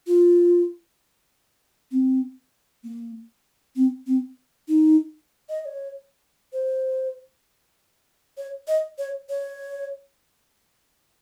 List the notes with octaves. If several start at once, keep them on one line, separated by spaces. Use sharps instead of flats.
F4
C4
A#3
C4
C4
D#4
D#5
D#5
C#5
C5
C#5
D#5
C#5
C#5